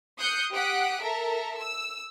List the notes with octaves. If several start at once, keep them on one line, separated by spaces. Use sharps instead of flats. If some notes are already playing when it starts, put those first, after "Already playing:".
D#6 F#6 G6 C7 C#7
G4 F#5 D#6 F#6 B6 D7
A4 A#4 E5 A#5
E6